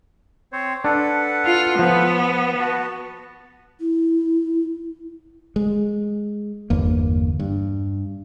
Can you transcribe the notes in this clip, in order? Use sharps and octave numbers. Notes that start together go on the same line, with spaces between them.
C4 C5 C#5
D4 A4 B4 F#5
F4
F3 B3
F#4 A5
E4
G#3
G1 E2 A#3
G2